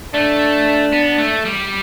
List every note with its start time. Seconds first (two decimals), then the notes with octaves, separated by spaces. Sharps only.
0.14 A3 D4
0.93 B3
1.18 A3
1.45 G3